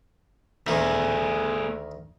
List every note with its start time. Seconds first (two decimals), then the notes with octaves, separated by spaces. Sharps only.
0.67 D2 D#3 A3 G#4